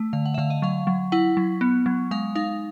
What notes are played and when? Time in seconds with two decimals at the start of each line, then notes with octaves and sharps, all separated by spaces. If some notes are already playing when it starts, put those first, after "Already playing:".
Already playing: A3
0.13 D3 F5
0.26 F#5
0.34 E5
0.38 D3 F5
0.50 D#5
0.62 F#3 F5
0.87 F#3
1.12 E4 F#5
1.37 F#3
1.61 B3
1.86 F#3
2.11 G#3 F5
2.36 D#4 F5